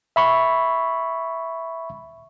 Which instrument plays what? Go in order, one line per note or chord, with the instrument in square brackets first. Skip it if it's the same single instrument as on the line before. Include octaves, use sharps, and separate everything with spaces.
[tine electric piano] E5 B5 C#6